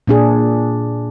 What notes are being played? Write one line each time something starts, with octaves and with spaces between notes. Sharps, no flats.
A#2 D4 G#4